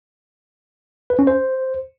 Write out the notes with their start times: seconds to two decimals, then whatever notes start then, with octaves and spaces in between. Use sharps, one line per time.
1.10 B4
1.19 C#4
1.27 C5